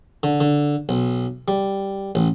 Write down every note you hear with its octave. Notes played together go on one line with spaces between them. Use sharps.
D3
D3
B1
G3
A1